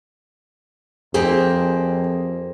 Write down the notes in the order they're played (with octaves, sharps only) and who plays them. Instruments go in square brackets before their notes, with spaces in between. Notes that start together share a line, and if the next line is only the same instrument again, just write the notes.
[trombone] F2 [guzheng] A#3 C4 G4 [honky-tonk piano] G#4